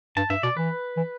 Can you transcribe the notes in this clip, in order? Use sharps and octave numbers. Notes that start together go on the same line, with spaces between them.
G2 A5
G2 E5
B2 D5
E3 B4
E3